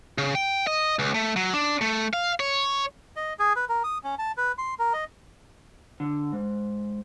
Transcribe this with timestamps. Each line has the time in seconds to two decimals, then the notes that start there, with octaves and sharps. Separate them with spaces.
0.18 C#3
0.35 G5
0.67 D#5
0.99 C#2
1.15 A3
1.36 F#3
1.54 D4
1.81 A3
2.13 F5
2.40 C#5
3.16 D#5
3.39 G#4
3.56 B4
3.69 A#4
3.84 D#6
4.04 C#4
4.19 A5
4.37 B4
4.58 C6
4.79 A#4
4.93 D#5
6.00 D3
6.32 G#2